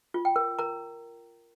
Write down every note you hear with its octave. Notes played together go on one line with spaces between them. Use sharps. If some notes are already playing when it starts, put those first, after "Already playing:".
F4
G5
A#4
A#4 A#5